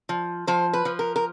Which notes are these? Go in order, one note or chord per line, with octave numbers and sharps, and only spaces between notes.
F3
F3 C5
B4
F3
A#4
A#4